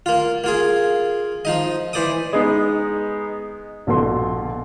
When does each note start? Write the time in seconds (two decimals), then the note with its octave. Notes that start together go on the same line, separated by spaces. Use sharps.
0.06 A#3 F4
0.44 A#3 F4 G#4
1.45 F3 D#4 D#5
1.93 E3 C5 D5 D6 D#6
2.33 G#3 B3 D#4
3.87 A#1 B2 A4 C6